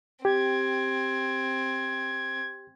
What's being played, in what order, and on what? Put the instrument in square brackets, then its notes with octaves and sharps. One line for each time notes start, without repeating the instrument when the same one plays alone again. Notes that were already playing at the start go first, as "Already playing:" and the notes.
[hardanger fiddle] C4 [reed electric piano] G4 [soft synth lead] G#6